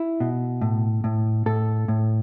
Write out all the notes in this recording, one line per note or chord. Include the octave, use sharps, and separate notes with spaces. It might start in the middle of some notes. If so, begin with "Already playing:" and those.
Already playing: E4
B2
A2
A2
A2 A4
A2